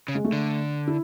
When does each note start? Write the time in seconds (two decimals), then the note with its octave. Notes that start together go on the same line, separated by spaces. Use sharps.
0.08 C#3
0.15 G#3
0.25 A3
0.32 D3
0.88 E4